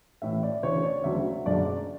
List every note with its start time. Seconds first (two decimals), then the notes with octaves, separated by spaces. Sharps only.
0.22 A1 A2 E3 E5
0.43 D5
0.63 D2 C#3 E3 C#5
0.83 D5
1.04 D2 C#3 F#3 E5
1.45 F#1 F#2 D3 F#3 D5